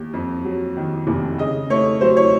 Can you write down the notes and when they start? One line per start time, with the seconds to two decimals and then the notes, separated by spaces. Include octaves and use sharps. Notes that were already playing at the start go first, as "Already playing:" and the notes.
Already playing: D#2
0.13 F2
0.45 F#3
0.77 D#3
1.07 F1
1.38 C#3 D#5
1.70 A3 C#5
2.01 F#3 C5
2.17 C#5